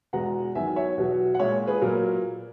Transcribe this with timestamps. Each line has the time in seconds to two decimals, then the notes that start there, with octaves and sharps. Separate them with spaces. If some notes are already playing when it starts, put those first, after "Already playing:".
0.13 E2 B2 G#3 F#5 A#5
0.55 E2 D#3 F#3 E5 G#5
0.76 C#5 E5
0.98 E2 B2 F#3
1.34 F#5
1.39 A#2 G#3 C#5 E5
1.68 G#4 B4
1.82 A#2 F#3 A#4